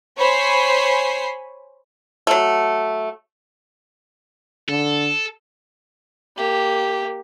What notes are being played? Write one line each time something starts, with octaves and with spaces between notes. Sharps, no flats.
C5 C#5 G#5 B5 C7
F#3 A3
D3 A4
A#3 G4